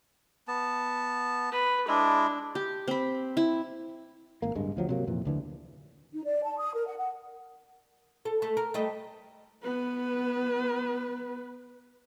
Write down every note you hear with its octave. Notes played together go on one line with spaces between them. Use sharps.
B3 A5
B4
G#3 D4 E4
G4
C4 B5
E4
G#1 A#3
D1 G2 G#3
D2 F3 F#3
C3 F#3 A#3
F2 A#2 E3
D2 D3 E3
D#4
D5
A5
D#6
A#4
F#5
F#5
A4
A3
A#4
G3 A3 D#5
B3 B4